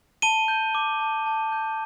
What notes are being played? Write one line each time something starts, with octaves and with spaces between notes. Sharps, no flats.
A5 D#7 G7
G6
D6
A5
A5
G6